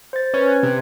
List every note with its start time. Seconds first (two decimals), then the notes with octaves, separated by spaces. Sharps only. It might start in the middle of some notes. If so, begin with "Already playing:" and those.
0.13 C5 A6
0.34 C#4 B4
0.48 F#6 G#6
0.63 C3